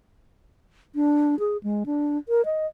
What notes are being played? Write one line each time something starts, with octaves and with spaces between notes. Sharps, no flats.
D4
G#4
G#3
D4
A#4
D#5